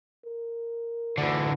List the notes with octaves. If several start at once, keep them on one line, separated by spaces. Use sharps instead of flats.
A#4
D2 D3 E3